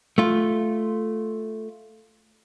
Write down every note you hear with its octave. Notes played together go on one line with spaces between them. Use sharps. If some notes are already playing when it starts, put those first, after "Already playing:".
A3 F4